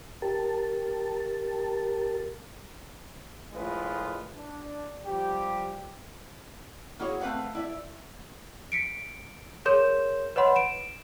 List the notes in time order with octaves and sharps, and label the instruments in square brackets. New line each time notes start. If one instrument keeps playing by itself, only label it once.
[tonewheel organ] G4 A#4 A5
[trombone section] A#1 A2 G#3 F4 B4
D4
F3 G3 G4
[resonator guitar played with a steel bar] A#3 E4 F#4 G#4 C#5
A3 C4 B4 F5 F#5
E4 D5 E5
[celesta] B6 C#7 D7
G#4 A#4 C#5 C6 G6 E7
B4 C#5 D#5 F#5 B5 C6
D7 E7